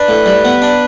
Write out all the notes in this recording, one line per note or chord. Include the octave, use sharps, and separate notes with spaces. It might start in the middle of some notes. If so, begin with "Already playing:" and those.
Already playing: D4 B4
A2
G3
B3
D4